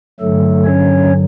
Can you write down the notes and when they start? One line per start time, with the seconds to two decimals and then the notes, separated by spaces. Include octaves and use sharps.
0.20 G2 D3 F#3 A3 A4
0.65 C#4 C#5